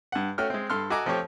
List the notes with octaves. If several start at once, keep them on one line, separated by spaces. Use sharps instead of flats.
G2 F#5
A3 C#4 F#4 G5 F6
G#3 C4
G2 A4 C6 F6
F#4 A4 D#5 G#5 A#5 D6
F3 A3 C4 G4 C#5